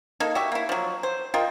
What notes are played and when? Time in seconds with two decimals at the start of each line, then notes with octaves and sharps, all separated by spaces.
0.20 A#3 D#4 A4
0.35 F#4 G4 E5
0.52 A#3 E4
0.69 F3 F#3
1.03 C5
1.34 F4 A#4 D#5 G5